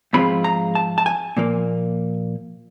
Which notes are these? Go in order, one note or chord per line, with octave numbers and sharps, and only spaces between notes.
G#2 F3 G#3 C4 F4 B5
A#5
A5
A5
G#5
A#2 F3 A#3